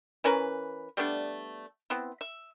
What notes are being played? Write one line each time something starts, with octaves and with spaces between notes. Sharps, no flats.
E3 C#4 A#4 B4
G3 A3 B3 D4
B3 C4 E4
E5